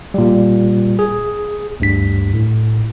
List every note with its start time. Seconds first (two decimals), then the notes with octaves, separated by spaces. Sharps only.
0.14 A#2 G3
0.99 G#4
1.80 D2 G2 B6
2.34 A2